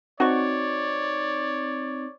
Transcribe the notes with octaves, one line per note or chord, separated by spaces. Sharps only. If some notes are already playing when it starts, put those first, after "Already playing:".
C4 D#4 F#4 C#5 D5 C#6